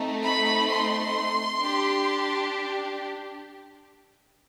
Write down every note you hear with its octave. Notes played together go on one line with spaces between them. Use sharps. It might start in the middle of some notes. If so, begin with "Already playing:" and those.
Already playing: A3 C4 D#4
B5
C6
D4 G4